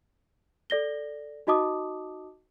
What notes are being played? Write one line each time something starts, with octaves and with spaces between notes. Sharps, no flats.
A4 D5 A#6 G7
D#4 F#4 D#5 A5 D6 D#6